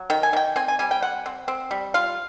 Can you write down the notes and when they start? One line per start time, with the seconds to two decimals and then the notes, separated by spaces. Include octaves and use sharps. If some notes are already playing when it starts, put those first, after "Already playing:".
Already playing: F#3
0.10 D#3 G5
0.23 G#5
0.33 D#3 G5
0.56 C4 G#5
0.68 G#5
0.79 G3 G#5
0.91 G5
1.02 C4 F#5
1.26 C4
1.48 C4
1.71 G3
1.94 F4 F5